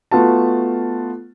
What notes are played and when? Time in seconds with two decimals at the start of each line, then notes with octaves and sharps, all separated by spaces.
0.11 A3 B3 F4 F#4 A5